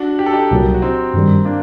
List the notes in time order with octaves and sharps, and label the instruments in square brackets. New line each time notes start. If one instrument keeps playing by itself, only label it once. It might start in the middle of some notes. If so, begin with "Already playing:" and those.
Already playing: [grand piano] D4 F#4
G4
A4
D#4 G4
[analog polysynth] C2 A#2 F#3
[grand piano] F#4
C4 D#4
[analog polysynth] G2 D#3 G3
[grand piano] A#3 D4